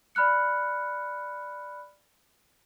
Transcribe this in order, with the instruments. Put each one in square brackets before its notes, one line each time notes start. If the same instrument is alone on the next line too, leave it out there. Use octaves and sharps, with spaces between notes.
[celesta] D5 B5 F6 F#6 C#7